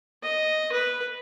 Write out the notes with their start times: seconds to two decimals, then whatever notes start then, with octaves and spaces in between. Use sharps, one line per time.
0.23 D#5
0.73 B4